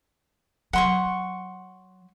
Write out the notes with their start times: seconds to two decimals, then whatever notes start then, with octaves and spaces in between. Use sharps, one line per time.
0.73 F#3 F#5 C6 C#6